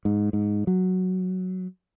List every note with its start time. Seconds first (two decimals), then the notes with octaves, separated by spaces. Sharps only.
0.05 G#2
0.33 G#2
0.67 F#3